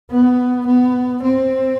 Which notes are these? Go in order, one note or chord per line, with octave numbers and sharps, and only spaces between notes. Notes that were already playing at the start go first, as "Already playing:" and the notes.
B3
B3
C4